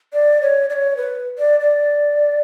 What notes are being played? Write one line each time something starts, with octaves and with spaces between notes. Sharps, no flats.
D5
C#5
D5
C#5
B4
D5
D5